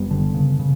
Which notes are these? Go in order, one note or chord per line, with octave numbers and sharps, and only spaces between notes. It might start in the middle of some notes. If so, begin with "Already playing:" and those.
Already playing: F#1 G3 B3
D3
C#3
C#3